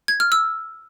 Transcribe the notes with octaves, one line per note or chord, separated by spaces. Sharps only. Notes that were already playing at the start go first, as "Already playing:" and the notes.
G#6
F6
E6